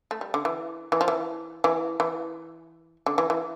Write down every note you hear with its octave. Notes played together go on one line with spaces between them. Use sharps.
A3
G3
D3
E3
E3
F3
E3
E3
E3
D3
E3
E3